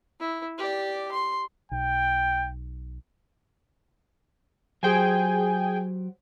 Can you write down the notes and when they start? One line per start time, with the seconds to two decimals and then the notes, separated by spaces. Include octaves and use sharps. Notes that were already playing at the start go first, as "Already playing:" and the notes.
0.20 E4
0.58 G4 D5
1.12 C6
1.72 B1 G5
4.83 F#3 G4 G#4 C5 G5 G#5